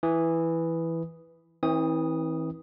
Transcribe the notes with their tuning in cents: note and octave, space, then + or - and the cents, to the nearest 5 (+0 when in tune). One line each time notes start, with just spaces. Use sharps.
E3 +0 D#6 -5
E3 -35 C4 +20 D#6 +0